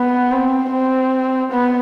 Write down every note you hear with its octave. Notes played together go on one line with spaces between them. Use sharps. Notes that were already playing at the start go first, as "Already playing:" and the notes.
Already playing: B3
C4
C4
B3